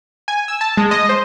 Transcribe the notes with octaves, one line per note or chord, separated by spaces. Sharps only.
G#5
E6
A5
G#3
D#5
C5